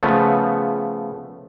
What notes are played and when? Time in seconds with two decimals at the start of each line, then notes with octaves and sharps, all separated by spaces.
0.03 C#3 F3 A3 B3